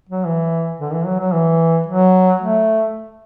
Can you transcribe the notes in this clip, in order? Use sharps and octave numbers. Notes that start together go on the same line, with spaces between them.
F#3
E3
D3
E3
F#3
F#3
E3
F#3
A3